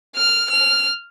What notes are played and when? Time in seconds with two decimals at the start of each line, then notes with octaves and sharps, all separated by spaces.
0.16 F6
0.50 F6